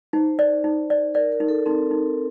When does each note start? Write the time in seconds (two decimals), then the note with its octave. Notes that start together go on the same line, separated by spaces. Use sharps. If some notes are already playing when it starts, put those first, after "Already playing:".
0.13 D#4 C5
0.39 D5
0.64 D#4
0.90 D5
1.15 A#4 D5
1.32 A#4
1.40 D#4
1.49 A4
1.66 C4 D#4
1.91 D#4